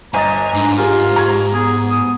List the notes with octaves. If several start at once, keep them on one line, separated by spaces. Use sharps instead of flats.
G1 D#5 G#5 A#5 A6
G#2 D4
F4 G4 G#4 A#4
A#5 C#6 G#6
B3 G#4
D#6